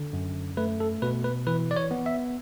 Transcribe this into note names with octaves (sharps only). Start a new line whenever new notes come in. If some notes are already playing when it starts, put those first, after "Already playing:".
Already playing: D3
F#2
A3 B4
A4
B2 B4
B4
E3 B4
D5
C#5
B3
E5